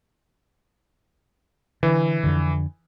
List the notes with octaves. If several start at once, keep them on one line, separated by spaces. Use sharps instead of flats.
D3 E3
F2 D3